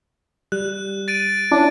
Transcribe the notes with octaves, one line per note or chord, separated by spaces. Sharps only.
G3 F#6
A6 D7 D#7
C#4 D4 E4